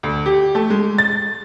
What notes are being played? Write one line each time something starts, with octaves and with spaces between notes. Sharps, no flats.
D2
G4
A3
G#3
A6